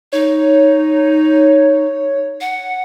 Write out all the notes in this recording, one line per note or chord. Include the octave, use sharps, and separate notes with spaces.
D#4 C#5
F#5